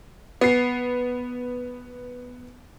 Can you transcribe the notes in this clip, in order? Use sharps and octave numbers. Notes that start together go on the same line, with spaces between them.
B3 C7